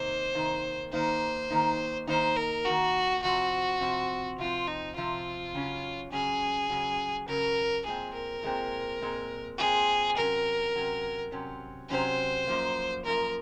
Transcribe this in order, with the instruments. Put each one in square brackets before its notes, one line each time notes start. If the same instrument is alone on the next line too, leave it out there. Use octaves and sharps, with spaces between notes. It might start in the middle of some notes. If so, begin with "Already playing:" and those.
Already playing: [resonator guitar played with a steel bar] C3 D#3 A#3 D#4 [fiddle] C5
[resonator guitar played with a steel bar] C3 D#3 A#3 D#4
[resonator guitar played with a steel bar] D#3 A#3 D#4 [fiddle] C5
[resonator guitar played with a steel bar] D#3 A#3 D#4
[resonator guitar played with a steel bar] D#3 A#3 D#4 [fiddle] C5
[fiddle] A#4
[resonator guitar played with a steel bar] D#3 A#3 D#4 [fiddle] F#4
[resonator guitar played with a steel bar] C3 F3 C4 [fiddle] F#4
[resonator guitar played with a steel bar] C3 F3 C4
[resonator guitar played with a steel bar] C3 F3 C4 [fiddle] F4
[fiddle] D#4
[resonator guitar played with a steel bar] C3 F3 C4 [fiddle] F4
[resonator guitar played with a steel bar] C#3 F#3 C#4
[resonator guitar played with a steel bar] C#3 F#3 C#4 [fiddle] G#4
[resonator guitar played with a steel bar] C#3 F#3 C#4
[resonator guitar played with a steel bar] C#3 F#3 C#4 [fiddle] A#4
[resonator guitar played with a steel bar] A#2 G#3 C4 [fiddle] G#4
[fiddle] A#4
[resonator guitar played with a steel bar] A#2 G#3 C4
A#2 G#3 C4
[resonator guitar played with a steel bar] A#2 G#3 C4 [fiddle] G#4
[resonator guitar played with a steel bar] C3 F#3 C#4 [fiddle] A#4
[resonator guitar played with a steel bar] C3 F#3 C#4
C3 F#3 C#4
[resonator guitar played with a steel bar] C3 F#3 C#4 [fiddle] C5
[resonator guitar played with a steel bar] F#2 F3 A#3
[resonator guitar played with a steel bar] F#2 F3 A#3 [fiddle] A#4